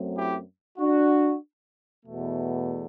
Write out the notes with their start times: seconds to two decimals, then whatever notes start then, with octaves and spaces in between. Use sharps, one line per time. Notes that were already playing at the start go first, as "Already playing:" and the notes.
Already playing: F#2 F#3 A3 C4
0.16 E4 G4
0.79 D4 F#4
2.05 E2 B2 A3